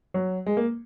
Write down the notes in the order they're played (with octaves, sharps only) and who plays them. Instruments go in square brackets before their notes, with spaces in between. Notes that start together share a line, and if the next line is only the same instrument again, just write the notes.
[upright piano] F#3
G#3
A#3